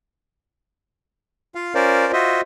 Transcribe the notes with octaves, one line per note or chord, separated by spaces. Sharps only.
F4 F5
C#4 F4 A#4 C5 D5
F4 F#4 C5 D#5 E5